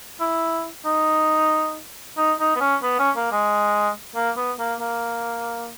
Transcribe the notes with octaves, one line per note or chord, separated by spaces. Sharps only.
E4
D#4
D#4
D#4
B3
C#4
B3
C#4
A#3
G#3
A#3
B3
A#3
A#3